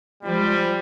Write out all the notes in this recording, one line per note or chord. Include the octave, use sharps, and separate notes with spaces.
F3 G3 G#3 C5